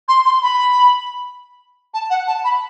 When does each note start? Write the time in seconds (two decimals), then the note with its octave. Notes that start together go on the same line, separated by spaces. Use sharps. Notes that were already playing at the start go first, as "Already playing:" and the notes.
0.08 C6
0.25 C6
0.42 B5
1.94 A5
2.10 F#5
2.27 A5
2.44 B5